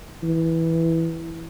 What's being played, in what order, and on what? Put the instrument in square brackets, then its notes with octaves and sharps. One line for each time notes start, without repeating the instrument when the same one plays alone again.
[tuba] E3